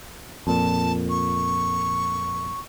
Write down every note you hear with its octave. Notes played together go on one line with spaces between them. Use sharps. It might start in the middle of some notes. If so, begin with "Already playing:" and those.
F2 A#2 A5
C#6